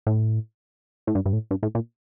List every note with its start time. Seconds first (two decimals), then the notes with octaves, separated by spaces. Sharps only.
0.07 A2
1.07 A2
1.15 G2
1.25 G2
1.33 A2
1.51 G2
1.63 A2
1.75 A#2